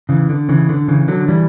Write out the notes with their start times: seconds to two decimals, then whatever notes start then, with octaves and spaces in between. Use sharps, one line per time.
0.09 C#3 E3
0.29 D3
0.49 C#3 E3
0.69 D3
0.88 C#3 E3
1.08 D3 F#3
1.28 E3 G3